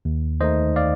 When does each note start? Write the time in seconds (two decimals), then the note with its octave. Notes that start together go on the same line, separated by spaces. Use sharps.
0.05 D#2
0.40 D#3 A3 D#4 C5 D#5
0.76 D5 F5